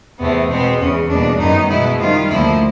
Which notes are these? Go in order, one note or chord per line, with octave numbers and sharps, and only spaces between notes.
E2 C3 E3 A3 B3
B2 G#3 B3 C4
E2 C#3 E3 C#4
E2 B2 G3 A#3 D4
F#2 D#3 G3 B3 D#4
B2 G#3 B3 E4
C3 D#3 G3 F4
D2 D3 F3 A#3 E4